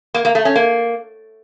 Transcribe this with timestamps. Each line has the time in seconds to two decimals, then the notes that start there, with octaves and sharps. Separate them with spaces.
0.14 A#3
0.25 A#3
0.35 A3
0.45 C#4
0.56 A#3